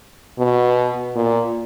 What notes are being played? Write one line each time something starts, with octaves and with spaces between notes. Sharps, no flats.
B2
A#2